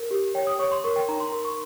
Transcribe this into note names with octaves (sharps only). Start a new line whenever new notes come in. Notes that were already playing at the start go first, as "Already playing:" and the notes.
Already playing: A#4
G4
C#5 G5
D#6
C#5 C#6
C6
A#4 C#6
G5
D#4 A#5
C6
A#4 C6
C#6